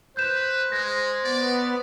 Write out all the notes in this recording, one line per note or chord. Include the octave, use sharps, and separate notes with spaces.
B4 C5 G6 E7
G#3 A#6
B3 D5